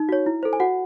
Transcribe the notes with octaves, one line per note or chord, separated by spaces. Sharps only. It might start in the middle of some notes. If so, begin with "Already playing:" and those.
Already playing: D#4
F#4 C#5
E4
A4 C5
G#5
F#4 F#5